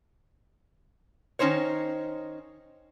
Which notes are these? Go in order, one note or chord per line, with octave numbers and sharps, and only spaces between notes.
D#3 C#4 D#4 C5 C#5